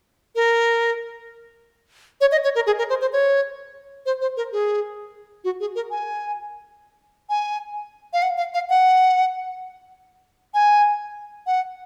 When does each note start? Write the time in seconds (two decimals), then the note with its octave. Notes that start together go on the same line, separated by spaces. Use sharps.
0.36 A#4
2.21 C#5
2.32 D#5
2.44 C#5
2.55 A#4
2.67 G#4
2.79 A#4
2.89 C5
3.01 C5
3.13 C#5
4.06 C5
4.21 C5
4.37 A#4
4.52 G#4
5.44 F#4
5.60 G#4
5.75 A#4
5.91 G#5
7.30 G#5
8.13 F5
8.23 F#5
8.38 F5
8.54 F5
8.69 F#5
10.54 G#5
11.47 F#5